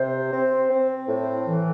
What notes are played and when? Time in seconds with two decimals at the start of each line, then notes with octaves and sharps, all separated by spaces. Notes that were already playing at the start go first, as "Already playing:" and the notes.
Already playing: C3 C5
0.32 C4
0.70 C4
1.08 A2
1.48 E3